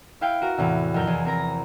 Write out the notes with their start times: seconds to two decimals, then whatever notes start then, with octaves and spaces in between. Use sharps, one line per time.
0.21 E4 B4 F5 G5
0.42 F#4 A#4
0.57 E2 A2 C3
0.94 F2 A#4 G6
1.07 E2 G#4
1.25 C4 A#4 A#5 A#6